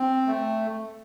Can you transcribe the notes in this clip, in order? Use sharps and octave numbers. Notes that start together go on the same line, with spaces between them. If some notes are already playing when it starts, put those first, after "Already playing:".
Already playing: C4
A3